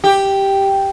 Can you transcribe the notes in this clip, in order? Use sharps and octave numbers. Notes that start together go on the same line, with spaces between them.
G4